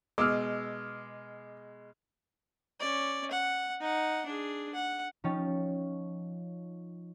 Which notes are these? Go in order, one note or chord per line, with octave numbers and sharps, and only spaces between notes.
B2 G#3 D6 E6 F6
C#4 D5
F#5
D#4 F#5
D4 G#4
F#5
F3 C#4 D#4 C#5 G5 A6